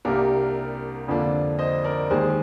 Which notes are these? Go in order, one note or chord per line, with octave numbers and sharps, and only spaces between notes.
C2 C3 G3 A#3 D4 A#4 D5
F2 D3 F3 A#3 D4
C5 D#5
A#4 D5
D#2 D#3 G#3 G#4 C5